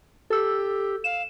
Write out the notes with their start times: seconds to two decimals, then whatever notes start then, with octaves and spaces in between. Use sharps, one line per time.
0.30 G4 A4 E6
1.04 F5 E7